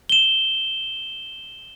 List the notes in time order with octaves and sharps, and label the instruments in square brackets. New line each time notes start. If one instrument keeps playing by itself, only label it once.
[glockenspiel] E7 G7